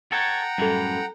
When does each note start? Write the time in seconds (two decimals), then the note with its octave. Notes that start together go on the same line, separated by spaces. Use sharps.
0.12 A4 C#5 F#5 G5 A#5
0.58 F#2 A2 E3 G3 A4